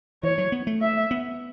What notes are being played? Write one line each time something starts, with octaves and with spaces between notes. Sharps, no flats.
E3 C#5
F#3
B3
A3
E5
B3